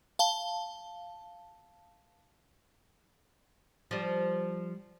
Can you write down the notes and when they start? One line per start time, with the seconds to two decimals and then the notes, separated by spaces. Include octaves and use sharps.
0.19 F5 A5 G7
3.91 F3 G3